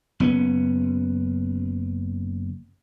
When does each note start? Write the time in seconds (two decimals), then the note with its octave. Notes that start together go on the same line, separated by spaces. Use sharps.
0.20 F#1 B3 C#4